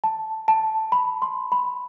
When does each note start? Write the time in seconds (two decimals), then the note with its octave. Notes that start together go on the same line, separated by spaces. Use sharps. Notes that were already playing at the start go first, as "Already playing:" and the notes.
0.04 A5
0.48 A5
0.92 B5
1.22 C6
1.52 B5